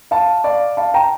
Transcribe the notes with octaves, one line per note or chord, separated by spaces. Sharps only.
F5 A5
D5 F5
F5 A5
G5 A#5